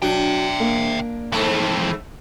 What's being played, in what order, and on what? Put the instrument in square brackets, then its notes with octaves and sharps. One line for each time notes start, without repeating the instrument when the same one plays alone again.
[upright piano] F#3 [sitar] D4 [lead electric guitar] E5 G5
[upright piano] A#3
[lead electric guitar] F2 E3 [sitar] G#2 A3